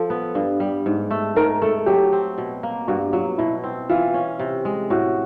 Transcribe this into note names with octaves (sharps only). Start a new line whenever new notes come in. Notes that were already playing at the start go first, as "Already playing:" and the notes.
Already playing: F3 A4
B3
G2
G3
G#2
A3
G#2 A#4
A3 A4
F#3 G4
C4
B2
A#3
G2 F#4
F#3 F4
B2 E4
C4
E3 F4
C#4
C3
G#3
A2 F#4